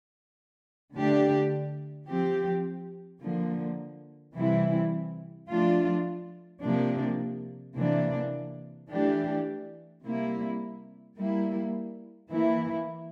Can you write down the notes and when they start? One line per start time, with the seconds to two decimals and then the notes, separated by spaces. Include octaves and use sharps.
0.94 D3 A3 D4 G4
2.08 F3 C4 G4
3.21 D3 F3 A#3
4.35 C3 E3 G3 C4 E4
5.49 F3 A3 D4 F4
6.62 C3 F3 A#3 D4
7.76 C3 E3 A#3 D4
8.89 E3 A3 D4 G4
10.04 C3 G3 A#3 E4
11.17 G3 A#3 E4
12.30 E3 A#3 E4